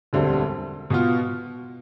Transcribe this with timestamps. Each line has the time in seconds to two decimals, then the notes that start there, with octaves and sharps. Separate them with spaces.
0.13 E1 D2 D3 G3 C4
0.90 B2 B3 F4